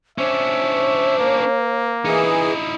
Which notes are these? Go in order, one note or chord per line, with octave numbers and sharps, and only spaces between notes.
C#4 D4 C5 E5
A#3
E3 D#4 E4 G#4